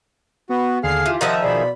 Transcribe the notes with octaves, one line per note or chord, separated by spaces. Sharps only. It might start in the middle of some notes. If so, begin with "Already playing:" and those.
B3 F#4
D#2 D3 G#4 F5 F6 C7
E3 F4 G4
D#3 F3 E5 F#5 A#5 D#6
B2 G#4 D5 B5